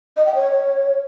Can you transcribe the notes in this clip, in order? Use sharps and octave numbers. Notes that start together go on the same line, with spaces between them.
D#5
G5
C#5